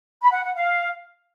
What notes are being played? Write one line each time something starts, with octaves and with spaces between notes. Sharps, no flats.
B5
F#5
F#5
F5